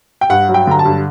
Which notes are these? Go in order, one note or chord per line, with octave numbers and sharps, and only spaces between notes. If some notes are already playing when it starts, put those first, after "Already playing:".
G5
G2 F#5
F#3
G5
D3 A#5
A5
G2